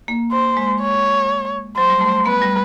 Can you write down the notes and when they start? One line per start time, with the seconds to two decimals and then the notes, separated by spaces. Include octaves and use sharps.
0.08 A#3
0.32 C5
0.57 G#3
0.81 C#5
1.77 F#3 C5
1.90 G3
2.01 A3
2.26 B3 B4
2.42 G3